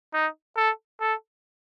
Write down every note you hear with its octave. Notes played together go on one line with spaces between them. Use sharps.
D#4
A4
A4